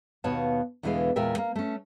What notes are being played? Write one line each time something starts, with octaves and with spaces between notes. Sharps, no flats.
D#2 B2 B3 C#5 F5 A5
E2 B2 D3 E3 G#3 F5
E2 A#2 G#3 A#4 E5 G5
A#3
A3 C#4